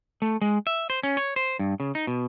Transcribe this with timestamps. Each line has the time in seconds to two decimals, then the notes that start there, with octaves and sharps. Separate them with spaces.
0.22 A3
0.41 G#3
0.67 E5
0.90 C5
1.03 C#4
1.17 C#5
1.36 C5
1.59 G2
1.80 C#3
1.95 D#4
2.07 B2